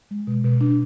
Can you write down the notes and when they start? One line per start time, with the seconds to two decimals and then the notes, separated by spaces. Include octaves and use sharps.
0.11 G#3
0.27 B2
0.45 B2
0.61 D4